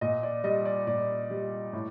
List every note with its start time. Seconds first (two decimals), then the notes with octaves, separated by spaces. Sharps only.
0.01 A#2 D#5
0.23 D5
0.44 G3 D#5
0.65 D5
0.87 A#2 D5
1.30 G3
1.73 A2